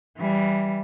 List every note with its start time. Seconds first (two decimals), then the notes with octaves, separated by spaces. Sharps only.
0.19 E3 G3